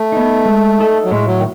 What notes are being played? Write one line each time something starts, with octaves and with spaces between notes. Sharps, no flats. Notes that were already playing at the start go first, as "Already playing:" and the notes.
Already playing: A3
B3 D#4
G#3
D#4 A4
F#3
A2 G#3
F#3
D#3